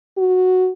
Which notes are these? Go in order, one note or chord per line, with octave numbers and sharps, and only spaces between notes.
F#4